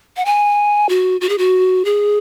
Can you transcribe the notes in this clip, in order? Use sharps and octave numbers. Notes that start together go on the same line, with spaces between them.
F#5
G#5
F#4
F#4
G#4
F#4
G#4